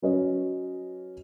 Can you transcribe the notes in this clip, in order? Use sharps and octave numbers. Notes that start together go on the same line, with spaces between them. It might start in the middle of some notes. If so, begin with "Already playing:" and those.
F#3 C#4 B4 D#5